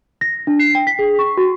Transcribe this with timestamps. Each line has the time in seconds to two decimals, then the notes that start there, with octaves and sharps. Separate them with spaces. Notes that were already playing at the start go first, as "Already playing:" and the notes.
0.21 A#6
0.47 D4
0.59 C7
0.75 G5
0.87 B6
0.99 G#4
1.19 C#6
1.37 F#4